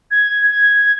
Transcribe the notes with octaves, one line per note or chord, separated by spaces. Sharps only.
G#6
G#6